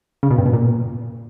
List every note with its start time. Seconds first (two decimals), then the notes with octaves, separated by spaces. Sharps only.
0.23 C#3
0.30 B2
0.38 G2
0.46 B2
0.53 A#2